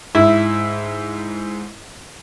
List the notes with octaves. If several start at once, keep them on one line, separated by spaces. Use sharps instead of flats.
G#2 E4